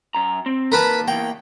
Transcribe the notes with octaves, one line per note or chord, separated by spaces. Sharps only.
F#2 A#5
C4
D#2 A#4 B4 A5 B5
E2 A#3 G5